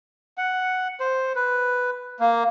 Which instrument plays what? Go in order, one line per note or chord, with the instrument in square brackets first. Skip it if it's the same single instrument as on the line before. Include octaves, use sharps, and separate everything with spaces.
[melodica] F#5
C5
B4
A#3